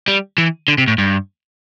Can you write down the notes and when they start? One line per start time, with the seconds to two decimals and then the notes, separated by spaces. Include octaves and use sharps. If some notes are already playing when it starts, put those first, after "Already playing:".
0.08 G3
0.38 E3
0.68 D3
0.78 C3
0.88 A2
0.98 G2